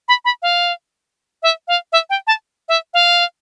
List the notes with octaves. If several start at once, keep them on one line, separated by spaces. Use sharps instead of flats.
B5
B5
F5
E5
F5
E5
G5
A5
E5
F5